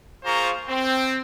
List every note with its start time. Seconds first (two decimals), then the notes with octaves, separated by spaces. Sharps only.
0.24 A#3 F4 G#4 C5 A#5 C#6
0.68 C4